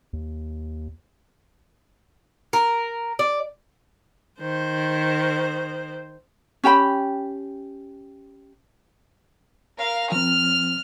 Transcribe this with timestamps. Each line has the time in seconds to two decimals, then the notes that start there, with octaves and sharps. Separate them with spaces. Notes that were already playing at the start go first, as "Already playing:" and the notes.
0.13 D#2
2.53 A#4
3.19 D5
4.41 D#3 C5
6.64 C#4 G4 G5 B5
9.79 A#4 F5
10.12 F3 C4 F6